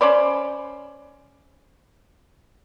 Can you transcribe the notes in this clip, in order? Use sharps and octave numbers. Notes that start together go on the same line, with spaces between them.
C#4 C5 D5 B5